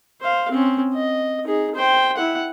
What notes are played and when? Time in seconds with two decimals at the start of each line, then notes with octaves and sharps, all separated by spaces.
0.21 C5 F5
0.51 C4 C#4
0.94 D#5
1.45 D#4 G#4
1.75 C5 G5
2.17 E4 F#5